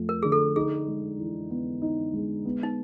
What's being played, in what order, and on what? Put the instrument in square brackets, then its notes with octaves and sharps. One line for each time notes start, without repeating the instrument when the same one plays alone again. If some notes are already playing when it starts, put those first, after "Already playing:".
Already playing: [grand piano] F2 F3 A3
[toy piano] A#4
[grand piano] D3 [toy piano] G#4
[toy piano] A4
[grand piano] D#4 [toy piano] G#4
[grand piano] G#3
E3
B3
D#4
G#3
B3
[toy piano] D#4